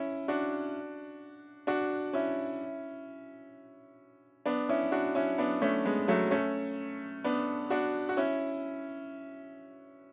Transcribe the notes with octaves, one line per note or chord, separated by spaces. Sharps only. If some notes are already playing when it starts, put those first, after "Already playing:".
Already playing: C#4 E4
D4 F#4
D4 F#4
C#4 E4
B3 D4
C#4 E4
D4 F#4
C#4 E4
B3 D4
A3 C#4
G#3 B3
F#3 A3
A3 C#4
B3 D4
D4 F#4
F#4
C#4 E4